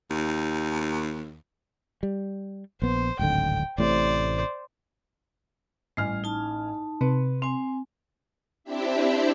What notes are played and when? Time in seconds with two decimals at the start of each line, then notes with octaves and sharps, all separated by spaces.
0.10 D#2
2.03 G3
2.82 A#1 B3 C5
3.19 D1 G#1 D3 G5
3.78 A1 A2 C3 C5 D5
5.97 A1 G3 G#5 F6
6.24 D#4 A5
7.01 C3 B4
7.42 C4 G#5 C6
8.64 C4 D4 E4 G4 E5